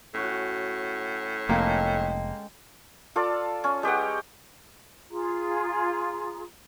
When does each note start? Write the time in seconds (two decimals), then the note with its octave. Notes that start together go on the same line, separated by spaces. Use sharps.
0.14 A2 C#4 F#4
1.49 F1 G#3 A#3 A4 G5
3.16 F4 A4 D5
3.64 C#4
3.83 G#3 G4 B4 F#5
5.10 F4 G#4 A#5